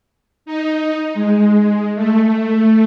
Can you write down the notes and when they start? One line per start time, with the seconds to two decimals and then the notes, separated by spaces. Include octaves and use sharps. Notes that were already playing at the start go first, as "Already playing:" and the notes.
0.46 D#4
1.15 G#3
1.95 A3